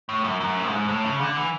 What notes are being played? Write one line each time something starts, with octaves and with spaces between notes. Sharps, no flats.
A2
F#2
F#2
A2
G#2
A2
C#3
D3
E3